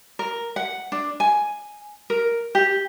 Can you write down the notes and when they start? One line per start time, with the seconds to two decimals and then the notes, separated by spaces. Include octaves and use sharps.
0.19 A#4
0.56 F#5
0.92 D4
1.20 G#5
2.10 A#4
2.55 G4